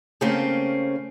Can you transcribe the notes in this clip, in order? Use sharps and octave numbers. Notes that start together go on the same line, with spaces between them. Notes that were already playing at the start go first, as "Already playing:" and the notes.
C#3 A3 A#3 C4 C#4 C5